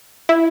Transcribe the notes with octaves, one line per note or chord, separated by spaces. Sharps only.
E4